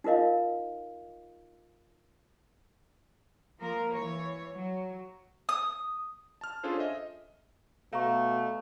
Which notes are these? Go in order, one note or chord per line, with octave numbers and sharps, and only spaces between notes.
D#4 F4 A#4 D#5 F5
F3 A#3 A#4
E3 C#5
F#3
D#6
A5 F6
C#4 D4 F4 G#4 A4 C5
D#5 E5
B2 A3 F5 A#5 C#6